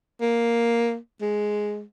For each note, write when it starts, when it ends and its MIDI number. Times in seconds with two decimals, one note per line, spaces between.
0.21 0.96 58
1.21 1.82 56